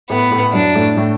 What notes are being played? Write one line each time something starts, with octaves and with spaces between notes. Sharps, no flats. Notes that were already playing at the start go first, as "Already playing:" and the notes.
A2 A3 B3
A2 A3
F#2 F#3 D4
A2 A3
A2 A3